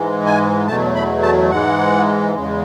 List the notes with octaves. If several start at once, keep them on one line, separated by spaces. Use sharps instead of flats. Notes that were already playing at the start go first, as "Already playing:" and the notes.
Already playing: G#2 E3 G#3
G#5
E2 B2 F#3 A3 A5
B5
A5
G#2 E3 G#3 F#5
E2 C#3 G#3